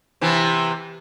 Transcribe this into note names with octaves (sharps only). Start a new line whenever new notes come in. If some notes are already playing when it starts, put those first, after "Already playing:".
C3 E3 B3